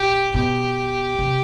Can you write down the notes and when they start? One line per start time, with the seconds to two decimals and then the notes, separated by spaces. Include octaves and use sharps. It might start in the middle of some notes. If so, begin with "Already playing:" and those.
Already playing: A#2 G4
0.34 B2 G4
1.19 C3